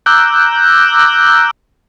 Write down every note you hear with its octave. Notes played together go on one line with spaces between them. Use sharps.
A#5 D6 E6 F#6 G6